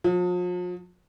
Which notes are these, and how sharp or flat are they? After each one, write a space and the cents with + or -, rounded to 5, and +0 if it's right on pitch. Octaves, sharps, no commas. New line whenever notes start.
F3 +40